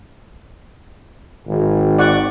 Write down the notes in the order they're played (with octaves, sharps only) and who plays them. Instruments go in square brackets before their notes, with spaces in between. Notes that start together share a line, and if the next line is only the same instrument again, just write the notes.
[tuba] G#1
[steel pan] D5 F#5 C#6